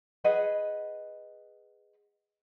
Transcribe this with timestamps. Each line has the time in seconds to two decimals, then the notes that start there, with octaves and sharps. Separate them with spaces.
0.24 G#4 B4 D#5 F#5